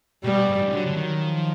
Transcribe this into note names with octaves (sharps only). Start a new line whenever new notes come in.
B2 G3
G#2
G2
G#2
C#3
D3 F#3
D3
D#3
F3